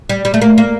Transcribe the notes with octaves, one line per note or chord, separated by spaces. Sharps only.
G3
G3
A3
A#3
A#3